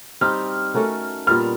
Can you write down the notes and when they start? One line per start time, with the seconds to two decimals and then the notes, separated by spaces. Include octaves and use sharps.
0.21 G3 C4 D#4 G4 F6
0.74 A3 C#4 F#4 A#4
1.27 A#2 G3 B3 F6